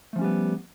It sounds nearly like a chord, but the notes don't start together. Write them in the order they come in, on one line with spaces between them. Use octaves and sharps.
A3 F3 C#4 G3 B3